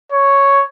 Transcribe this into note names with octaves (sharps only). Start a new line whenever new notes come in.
C#5